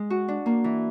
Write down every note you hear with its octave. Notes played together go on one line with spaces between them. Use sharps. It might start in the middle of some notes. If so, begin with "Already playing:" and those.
Already playing: G#3
F#4
D4
A#3
E3